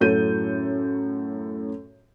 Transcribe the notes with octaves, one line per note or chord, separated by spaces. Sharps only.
F#2 A2 F#3 A4 G6 D#7